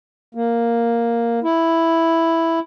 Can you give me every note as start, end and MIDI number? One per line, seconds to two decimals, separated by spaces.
0.35 1.40 58
1.44 2.59 64